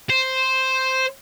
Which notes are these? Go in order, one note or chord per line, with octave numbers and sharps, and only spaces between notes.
C5